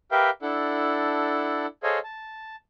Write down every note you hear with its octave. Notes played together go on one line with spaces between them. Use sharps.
G4 A#4 B4 E5 F5 G5
D4 E4 A4 F#5
G#4 A4 C5 C#5 D#5 F5
A5